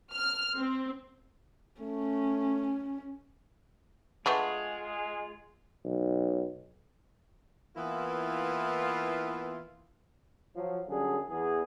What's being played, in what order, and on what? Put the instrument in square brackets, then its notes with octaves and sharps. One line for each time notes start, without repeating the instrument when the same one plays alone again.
[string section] F6
C4
[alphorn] A3 [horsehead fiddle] C#4
[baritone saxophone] G#3 [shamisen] A3 B3 D4 [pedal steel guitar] F4 G#4
[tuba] B1
[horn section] E3 A#3 B3 E4 F4
[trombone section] F3 F#3
F#2 D3 G3 G#4
E2 G#4